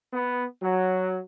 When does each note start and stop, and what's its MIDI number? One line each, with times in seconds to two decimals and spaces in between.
0.12 0.44 59
0.62 1.19 54